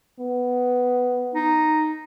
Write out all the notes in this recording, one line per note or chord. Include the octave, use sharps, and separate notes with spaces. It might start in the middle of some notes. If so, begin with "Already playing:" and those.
B3
D#4